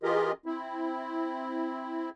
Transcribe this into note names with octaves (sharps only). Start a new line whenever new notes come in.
E3 F4 G4 G#4 A#4 D#5
C4 E4